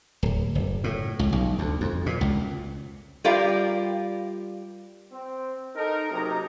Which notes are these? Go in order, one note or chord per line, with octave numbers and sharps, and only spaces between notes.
D1
F#1
A2
C#2
B1
D2
F2
A#2
C#2
G3 F4 G4 A#4 D5 F5
C4
D#4 A4 A#4
F#1 C3 F#3 D#4 G4 A#5